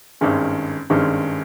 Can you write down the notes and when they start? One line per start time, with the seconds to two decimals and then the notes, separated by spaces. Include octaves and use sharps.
0.21 G#1 G2 D#3 G#3 C#4
0.90 G#1 G2 D#3 G#3 C#4